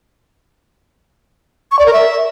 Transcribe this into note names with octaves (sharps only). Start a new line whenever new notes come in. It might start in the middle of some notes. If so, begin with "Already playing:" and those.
C#6
D5
A#4
E5